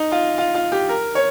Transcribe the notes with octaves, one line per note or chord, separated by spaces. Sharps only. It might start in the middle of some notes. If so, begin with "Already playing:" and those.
Already playing: D#4
F4
F4
F4
G4
A#4
C#5